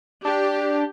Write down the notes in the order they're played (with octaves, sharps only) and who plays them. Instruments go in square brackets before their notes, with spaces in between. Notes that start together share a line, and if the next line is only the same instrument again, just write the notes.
[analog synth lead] D4 [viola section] G4